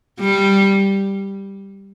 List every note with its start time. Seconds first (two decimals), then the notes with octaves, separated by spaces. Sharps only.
0.20 G3